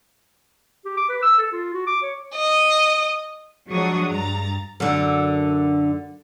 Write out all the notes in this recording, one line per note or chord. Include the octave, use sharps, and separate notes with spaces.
G4
D6
B4
E6
A4
F4
F#4
D6
C#5
D#5
F3 F#3 G#3 D4 C#6 D#6
G2 A#5 A6
F#2 D3